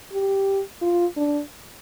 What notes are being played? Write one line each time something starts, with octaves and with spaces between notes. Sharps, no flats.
G4
F4
D4